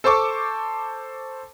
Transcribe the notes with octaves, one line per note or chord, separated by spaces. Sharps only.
A4 C5 A5 C#6 D6